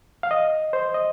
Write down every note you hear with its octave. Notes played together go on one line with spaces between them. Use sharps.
F5
D#5
C5
D#5